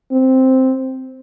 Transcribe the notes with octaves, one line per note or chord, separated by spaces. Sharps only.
C4